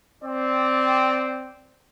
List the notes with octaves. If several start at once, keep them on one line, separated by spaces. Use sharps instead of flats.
C4 D5